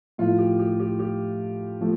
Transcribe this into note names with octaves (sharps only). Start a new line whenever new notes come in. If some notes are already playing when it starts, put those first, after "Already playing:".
A2 F3 A3 F4
G4
G4
G4
G4
F3 A3